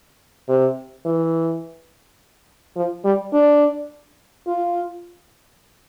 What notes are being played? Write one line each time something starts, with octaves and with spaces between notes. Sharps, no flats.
C3
E3
F3
G3
D4
F4